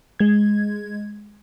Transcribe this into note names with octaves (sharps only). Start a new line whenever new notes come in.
G#3 G#6